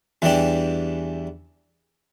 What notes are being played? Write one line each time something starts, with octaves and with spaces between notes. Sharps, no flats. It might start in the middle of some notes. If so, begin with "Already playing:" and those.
E2 E3 G3 D4 G4